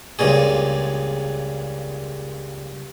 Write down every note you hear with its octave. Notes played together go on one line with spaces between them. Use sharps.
C#2 G2 A#2 G#4